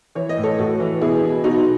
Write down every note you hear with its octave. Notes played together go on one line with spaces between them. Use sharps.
E3 C#5
D#5
A2
A4 C#5
A2 F#4 A4
E3
B2 E4 G#4
B2
B2 D#4 F#4